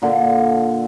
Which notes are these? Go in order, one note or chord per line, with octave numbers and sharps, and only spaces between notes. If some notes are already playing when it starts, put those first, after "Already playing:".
A#2 D3